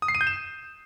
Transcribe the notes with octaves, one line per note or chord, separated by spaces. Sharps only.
D#6
C7
D#7
G6
E7